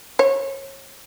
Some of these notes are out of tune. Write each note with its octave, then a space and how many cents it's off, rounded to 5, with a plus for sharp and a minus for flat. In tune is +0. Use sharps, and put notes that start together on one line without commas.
C#5 -30